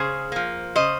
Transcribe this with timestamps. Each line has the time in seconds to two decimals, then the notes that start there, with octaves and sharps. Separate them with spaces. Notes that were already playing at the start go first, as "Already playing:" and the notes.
Already playing: C#3 G#4 C5
0.32 F3 A#3
0.76 C#3 C5 D#5